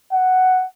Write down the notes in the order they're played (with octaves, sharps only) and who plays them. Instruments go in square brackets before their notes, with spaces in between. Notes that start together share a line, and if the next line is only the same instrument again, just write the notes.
[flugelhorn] F#5